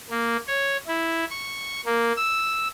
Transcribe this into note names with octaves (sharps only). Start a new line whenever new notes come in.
A#3
C#5
E4
C#6
A#3
E6